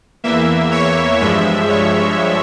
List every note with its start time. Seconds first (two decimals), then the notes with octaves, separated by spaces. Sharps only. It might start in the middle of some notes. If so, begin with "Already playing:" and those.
0.24 E2 E3 A#3 E5
0.72 C#5
1.20 G2 F3 G#3 E5
1.68 C#5